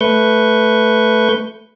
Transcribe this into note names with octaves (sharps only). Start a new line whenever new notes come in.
A3 B4 C#6 G6